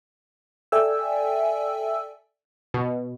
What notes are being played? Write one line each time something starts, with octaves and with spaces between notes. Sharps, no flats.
A4 D5 E5 G5 G#5 E6
B2